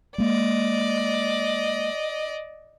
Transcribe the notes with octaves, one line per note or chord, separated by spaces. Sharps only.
G#3 A#3 D5 D#5